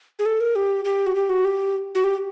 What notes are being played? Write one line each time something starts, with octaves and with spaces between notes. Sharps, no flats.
G#4
A4
A#4
G4
G4
F#4
G4
F#4
G4
F#4
G4